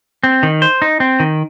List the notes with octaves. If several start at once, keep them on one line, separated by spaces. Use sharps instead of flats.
C4
D#3
C5
D#4
C4
D#3